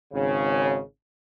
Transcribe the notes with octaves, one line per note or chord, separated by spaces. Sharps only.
G#1 C#3